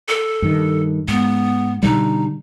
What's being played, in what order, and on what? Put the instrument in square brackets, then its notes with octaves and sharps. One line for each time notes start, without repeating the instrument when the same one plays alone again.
[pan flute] A4
[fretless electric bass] G2 D#3
[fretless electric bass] G#2 [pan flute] B3
[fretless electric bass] B2 D3 G3 [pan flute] D#4